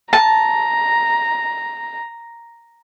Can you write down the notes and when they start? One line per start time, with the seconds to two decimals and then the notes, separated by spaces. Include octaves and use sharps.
0.13 A5 A#5